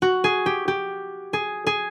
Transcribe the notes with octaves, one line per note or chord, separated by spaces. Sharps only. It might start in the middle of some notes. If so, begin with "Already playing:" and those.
F#4
G#4
G4
G4
G#4
G#4